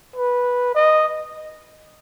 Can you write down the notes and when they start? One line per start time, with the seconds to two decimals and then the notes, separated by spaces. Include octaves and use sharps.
0.16 B4
0.75 D#5